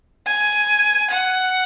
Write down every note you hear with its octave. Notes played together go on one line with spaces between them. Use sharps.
G#5
F#5